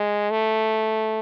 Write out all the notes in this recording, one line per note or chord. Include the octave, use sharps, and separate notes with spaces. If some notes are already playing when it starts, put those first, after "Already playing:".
Already playing: G#3
A3